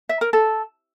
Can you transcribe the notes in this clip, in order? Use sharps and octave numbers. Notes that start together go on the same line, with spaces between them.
E5
A#4
A4